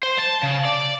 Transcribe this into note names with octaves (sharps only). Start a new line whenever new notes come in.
C5
A5
C#3
D5